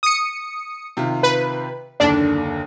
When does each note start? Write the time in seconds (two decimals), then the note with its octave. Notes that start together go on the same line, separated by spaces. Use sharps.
0.03 D#6 C#7
0.97 C3 D#3 F4
1.23 B4
2.00 F#1 D#2 D3 D4